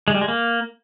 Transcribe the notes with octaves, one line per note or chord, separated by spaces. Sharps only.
G#3
G3
G#3
A#3